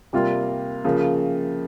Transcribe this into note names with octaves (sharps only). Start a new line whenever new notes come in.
C3 G3 A#3 F4
C#3 F3 A#3